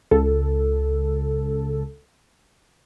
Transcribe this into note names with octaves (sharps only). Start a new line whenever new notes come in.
C#2 A4